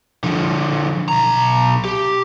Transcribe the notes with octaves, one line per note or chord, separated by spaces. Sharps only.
D3 F3
B1 A#5
G4